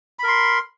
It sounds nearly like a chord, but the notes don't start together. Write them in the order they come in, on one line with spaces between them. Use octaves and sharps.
B5 A#4 C6